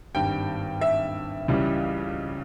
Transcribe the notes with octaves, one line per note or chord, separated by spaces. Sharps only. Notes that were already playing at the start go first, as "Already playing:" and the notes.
G#1 G2 G3 G5
E5
C#2 C#3 E3 G3